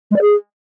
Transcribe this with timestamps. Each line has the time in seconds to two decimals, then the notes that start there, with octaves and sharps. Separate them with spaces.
0.11 G#3
0.16 D5
0.21 G#4